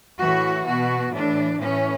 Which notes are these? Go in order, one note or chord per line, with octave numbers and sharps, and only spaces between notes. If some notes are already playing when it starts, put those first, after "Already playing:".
A2 E3 F#4
B2 F#4
A2 E3 D4
A2 E3 C#4